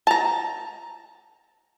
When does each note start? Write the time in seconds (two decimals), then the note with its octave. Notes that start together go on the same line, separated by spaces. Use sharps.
0.07 A5 A#5